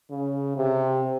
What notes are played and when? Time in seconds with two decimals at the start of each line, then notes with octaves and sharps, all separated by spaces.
0.11 C#3
0.56 C3